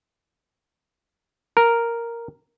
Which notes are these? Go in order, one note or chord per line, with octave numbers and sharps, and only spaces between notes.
A#4